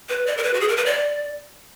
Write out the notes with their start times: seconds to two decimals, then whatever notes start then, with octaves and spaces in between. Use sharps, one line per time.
0.09 B4
0.26 D5
0.37 A#4
0.43 B4
0.54 F#4
0.60 G#4
0.68 A#4
0.77 B4
0.85 D5